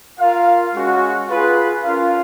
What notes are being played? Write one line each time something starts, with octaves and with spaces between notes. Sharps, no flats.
F4 A#4 F5
G#3 C#4 F#4
F4 G#4 B4
C#4 F4 A#4 F5